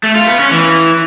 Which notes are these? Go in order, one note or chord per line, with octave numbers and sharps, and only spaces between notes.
A3
F4
B3
C#4
E3